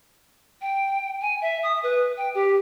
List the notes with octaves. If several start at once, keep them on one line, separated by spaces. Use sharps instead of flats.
G5
G#5
E5
D#6
B4
G5
G4